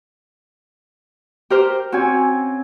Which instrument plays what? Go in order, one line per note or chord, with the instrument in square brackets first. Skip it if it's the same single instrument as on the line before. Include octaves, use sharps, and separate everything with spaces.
[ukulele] G4 A#4 C5
[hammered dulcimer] C4 C#4 G#5 [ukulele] F#4